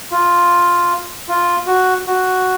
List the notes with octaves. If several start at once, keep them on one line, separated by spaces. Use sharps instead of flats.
F4
F4
F#4
F#4